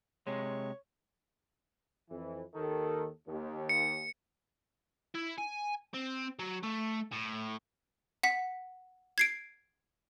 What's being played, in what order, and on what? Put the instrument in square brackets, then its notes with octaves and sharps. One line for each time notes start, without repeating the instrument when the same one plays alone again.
[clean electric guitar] C3 G#3 [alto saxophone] C#5
[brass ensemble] F2 E3
D#2 D#3 A4
D#2
[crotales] C#7
[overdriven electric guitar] E4
G#5
C4
F#3
A3
A2
[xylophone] F#5 B6
G#6 C7 D7